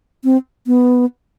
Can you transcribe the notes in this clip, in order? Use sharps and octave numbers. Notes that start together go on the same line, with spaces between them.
C4
B3